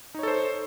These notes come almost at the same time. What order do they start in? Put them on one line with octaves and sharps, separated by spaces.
D#4 C#5 A4 C5